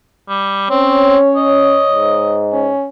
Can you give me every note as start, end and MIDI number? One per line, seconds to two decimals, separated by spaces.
0.29 0.67 55
0.70 1.17 60
0.70 1.81 61
0.70 2.44 73
1.37 2.43 75
1.91 2.71 44
2.52 2.88 61